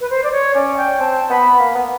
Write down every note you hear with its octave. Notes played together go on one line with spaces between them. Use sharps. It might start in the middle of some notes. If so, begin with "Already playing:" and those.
B4
C5
D5
C#5
C#4 D5
G5
C4 A5
B3 B5
A#3
B3